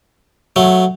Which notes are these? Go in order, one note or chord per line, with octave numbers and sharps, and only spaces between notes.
F#3 A3